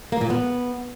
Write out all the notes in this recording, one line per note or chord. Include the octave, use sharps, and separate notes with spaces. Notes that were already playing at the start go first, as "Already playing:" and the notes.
A#3
A#2
B3